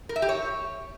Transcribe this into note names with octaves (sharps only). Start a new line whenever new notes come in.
A#4
E5
G4
C#5